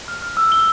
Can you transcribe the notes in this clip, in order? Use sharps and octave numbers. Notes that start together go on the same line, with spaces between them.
F6
F6
E6
G7